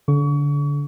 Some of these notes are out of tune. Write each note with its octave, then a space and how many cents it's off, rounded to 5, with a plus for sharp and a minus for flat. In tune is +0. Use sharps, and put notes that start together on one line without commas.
D3 -25 C#6 +35